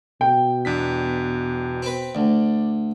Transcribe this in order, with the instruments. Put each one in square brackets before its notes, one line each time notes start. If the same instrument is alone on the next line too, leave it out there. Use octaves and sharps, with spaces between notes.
[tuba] B2 [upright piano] G5
[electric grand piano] E2 D4 B6
[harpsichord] C4 B4
[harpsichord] D2 [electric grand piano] D5